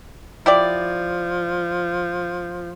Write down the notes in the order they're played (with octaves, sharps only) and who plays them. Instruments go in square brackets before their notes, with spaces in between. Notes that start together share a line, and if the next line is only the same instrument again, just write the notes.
[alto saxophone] F3 [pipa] E4 G4 D5